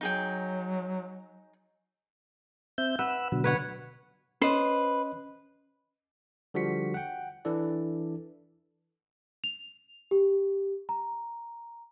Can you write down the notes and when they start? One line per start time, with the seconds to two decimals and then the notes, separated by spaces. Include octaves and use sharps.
0.01 F#3 D#4 G#4 G5
2.78 C4 E5 G6
2.99 B4 F#5 E6
3.32 B2 D3 F#3
3.44 B4 C#5 F#5
4.42 C#4 B4 C5 D#5
6.54 D3 F3 G3 F#4 B6 C#7
6.94 F#5 G5
7.45 E3 D4 E4 A4 D5
9.44 F7
10.11 G4
10.89 A#5